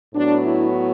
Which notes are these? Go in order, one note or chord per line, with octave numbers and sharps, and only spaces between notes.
A2 F#3 B3 D4
E4